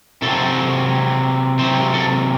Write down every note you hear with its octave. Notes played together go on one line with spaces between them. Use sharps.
C3 F#3 C4 A4
C3 F#3 C4 C5
A4